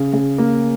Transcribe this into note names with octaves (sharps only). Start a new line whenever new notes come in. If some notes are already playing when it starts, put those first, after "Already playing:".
Already playing: C#3
C#3
A#3